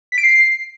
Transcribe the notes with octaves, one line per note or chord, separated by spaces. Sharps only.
B6
D7
C7